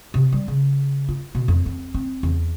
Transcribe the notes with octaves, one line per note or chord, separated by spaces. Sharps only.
C3
G3
C#3
F4
B2
F2
C4
C4
E2